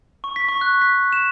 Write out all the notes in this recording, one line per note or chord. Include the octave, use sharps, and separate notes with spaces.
C#6
B6
C#6
F#6
B6
E7